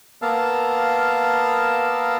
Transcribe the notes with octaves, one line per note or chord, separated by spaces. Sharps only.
A#3 B3 A#4 F5 A5 E6